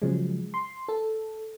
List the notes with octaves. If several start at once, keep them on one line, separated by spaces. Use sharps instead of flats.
C#3 F3 F#3 G#3
C6
A4